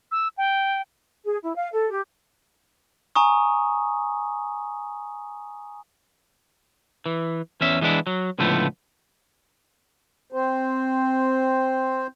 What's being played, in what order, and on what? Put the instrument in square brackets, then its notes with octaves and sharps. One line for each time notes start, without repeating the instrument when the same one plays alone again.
[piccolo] E6
G5
[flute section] G#4
E4
F5
A4
G4
[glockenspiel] G#5 A#5 C#6 D#6
[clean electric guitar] E3
E2 C#4 E5
E3 G#3 B3 D4 E4
F#3
C#2 A2 D3 F3 A3 B3
[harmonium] C4 C5